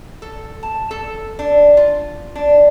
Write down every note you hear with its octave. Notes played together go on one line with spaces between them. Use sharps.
A4
A5
A4
D4
F4
D4